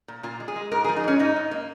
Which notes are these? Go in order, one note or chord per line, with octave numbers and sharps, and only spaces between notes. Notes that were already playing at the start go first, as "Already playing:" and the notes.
A#2
A#2 F4
G#3
G#4
G#3
G#2 A#4
G#4
F3
D#4
G#2 C#4
G#2 D#4
G#2
A#3